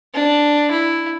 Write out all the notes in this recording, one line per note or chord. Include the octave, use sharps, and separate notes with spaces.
D4
E4